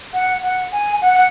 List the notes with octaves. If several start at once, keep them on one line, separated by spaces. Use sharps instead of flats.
F#5
F#5
G#5
F#5
F#5